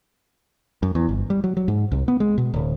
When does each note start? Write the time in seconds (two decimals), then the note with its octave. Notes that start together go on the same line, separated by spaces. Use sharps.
0.83 F#2
0.95 E2
1.09 G1
1.30 G3
1.44 F#3
1.57 F#3
1.68 G#2
1.92 C2
2.08 B3
2.20 G#3
2.38 B2
2.54 D1